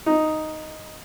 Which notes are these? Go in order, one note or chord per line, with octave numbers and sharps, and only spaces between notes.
D#4